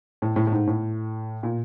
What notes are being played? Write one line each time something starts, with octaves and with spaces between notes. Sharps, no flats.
A2
A2
A2
G#2
A2
A#2